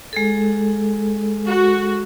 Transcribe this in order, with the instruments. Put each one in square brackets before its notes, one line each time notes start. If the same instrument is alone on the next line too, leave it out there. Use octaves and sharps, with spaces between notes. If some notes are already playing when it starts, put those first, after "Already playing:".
[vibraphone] G#3 G#4 A4
[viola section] F#4